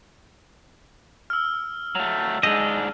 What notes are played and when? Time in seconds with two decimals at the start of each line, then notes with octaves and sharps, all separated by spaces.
1.30 E6 F6
1.95 F#3 A3
2.43 G#2 G#3 D4 D#5 E6